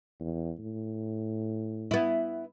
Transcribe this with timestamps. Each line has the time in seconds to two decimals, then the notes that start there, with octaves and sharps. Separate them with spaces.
0.20 E2
0.59 A2
1.91 B3 E4